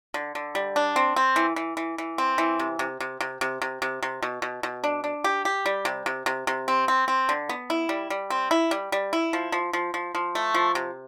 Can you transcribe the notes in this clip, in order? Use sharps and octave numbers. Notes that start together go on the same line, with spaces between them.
D3
D3
G3
D4
C4
C4
E3
E3
E3
E3
C4
E3
C3
C3
C3
C3
C3
C3
C3
C3
B2
B2
B2
D4
D4
G4
G4
G3
C3
C3
C3
C3
C4
C4
C4
D3
B3
E4
G3
G3
C4
E4
G3
G3
E4
F3
F3
F3
F3
F3
A3
F3
C3